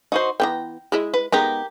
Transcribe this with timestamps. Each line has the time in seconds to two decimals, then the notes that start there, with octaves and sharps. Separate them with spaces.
0.12 D#4 F#4 C5
0.40 E3 F3 B3 G5 A#5
0.92 G#3 E4 D#5
1.14 B4
1.32 G#3 B3 D#4 G4 A#4 A#5